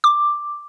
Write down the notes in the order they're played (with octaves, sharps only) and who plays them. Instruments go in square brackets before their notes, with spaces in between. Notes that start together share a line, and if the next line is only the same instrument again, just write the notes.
[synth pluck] D6